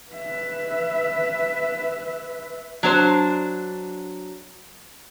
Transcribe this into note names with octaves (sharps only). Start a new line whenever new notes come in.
B4 E5
F#3 D4 C5